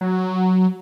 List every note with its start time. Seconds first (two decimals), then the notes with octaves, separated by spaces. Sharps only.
0.01 F#3